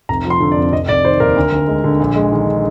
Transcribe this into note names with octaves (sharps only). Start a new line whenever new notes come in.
F1 A#5
F3
C6
D3
D5
F2
F1 D#5
F1 D5
D#3 C5
D#2 A#4
D2
D2
G#3
D3
A#1
G#3
D#3